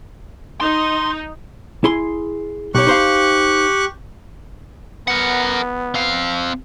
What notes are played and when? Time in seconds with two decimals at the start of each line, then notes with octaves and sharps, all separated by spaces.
0.61 D#4 C6
1.84 E4 G#4 C6
2.75 B1 G4 C#5 C#6 F#6
2.87 D#4 C5 F5
5.08 B3 A#4 F#5
5.95 C4 F5